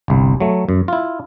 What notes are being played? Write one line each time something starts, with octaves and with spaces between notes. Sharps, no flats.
G1 C2
F#3 A3
F#2
E4 F4